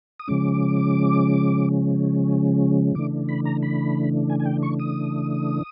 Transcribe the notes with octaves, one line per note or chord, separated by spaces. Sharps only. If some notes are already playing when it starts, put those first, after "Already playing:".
D#6
C#3 F3 G#3 C#4 D6
C#3 E3 A3 D4 D6
B5
A#5
B5
G#5
G#5
G5
C#6
D#6